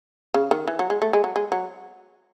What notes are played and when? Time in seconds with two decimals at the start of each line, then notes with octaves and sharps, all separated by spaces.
0.34 C#3
0.51 D#3
0.68 E3
0.79 F#3
0.90 G#3
1.02 A3
1.13 G#3
1.24 F#3
1.36 G#3
1.52 F#3